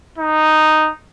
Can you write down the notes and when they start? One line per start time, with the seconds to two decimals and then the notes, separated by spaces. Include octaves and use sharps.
0.18 D#4